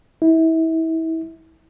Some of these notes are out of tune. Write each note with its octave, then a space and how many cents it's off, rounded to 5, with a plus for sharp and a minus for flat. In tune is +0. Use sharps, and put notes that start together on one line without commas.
E4 -30